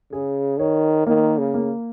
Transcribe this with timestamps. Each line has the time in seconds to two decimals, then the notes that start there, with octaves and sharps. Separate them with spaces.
0.12 C#3 G#4
0.59 D#3 C#5
1.06 D#3 A#3
1.38 C#3
1.54 A#3